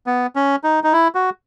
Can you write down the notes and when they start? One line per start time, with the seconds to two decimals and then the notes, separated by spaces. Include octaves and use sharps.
0.06 B3
0.36 C#4
0.64 D#4
0.84 D#4
0.93 E4
1.15 F#4